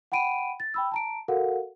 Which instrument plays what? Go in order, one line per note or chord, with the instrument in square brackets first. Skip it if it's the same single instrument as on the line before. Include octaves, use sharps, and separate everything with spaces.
[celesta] F#5 G5 B5 D7 D#7
A6
G5 B5 E6
A5 A#5 D7
F#4 A4 A#4 F5 F#5